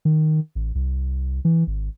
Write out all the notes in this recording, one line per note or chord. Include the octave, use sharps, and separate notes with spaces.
D#3
A1
C2
E3
G#1